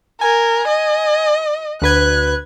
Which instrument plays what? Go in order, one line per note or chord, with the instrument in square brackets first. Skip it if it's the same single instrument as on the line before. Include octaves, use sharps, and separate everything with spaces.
[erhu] A#4 [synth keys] G#5
[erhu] D#5
[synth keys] D2 B4 G#6 [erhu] F#6